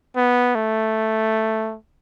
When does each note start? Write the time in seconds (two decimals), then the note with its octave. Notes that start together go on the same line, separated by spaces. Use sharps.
0.16 B3
0.55 A3